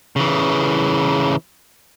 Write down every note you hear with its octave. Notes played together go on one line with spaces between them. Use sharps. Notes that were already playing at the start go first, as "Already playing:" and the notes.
C#3 E3